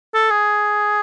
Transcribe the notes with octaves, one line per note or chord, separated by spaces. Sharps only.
A4
G#4